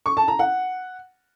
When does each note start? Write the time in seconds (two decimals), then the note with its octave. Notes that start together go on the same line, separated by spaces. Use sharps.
0.06 C#6
0.17 A5
0.28 A#5
0.39 F#5